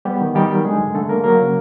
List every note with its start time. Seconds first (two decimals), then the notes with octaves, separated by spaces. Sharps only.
0.05 G3 B3 G4
0.21 D#3
0.35 D#3 G3 G4
0.50 F#3
0.65 D3 G#3 G#4
0.80 G2
0.95 D3 A3 A4
1.09 A#3 A#4
1.24 F#3 A#3 A#4
1.39 C#3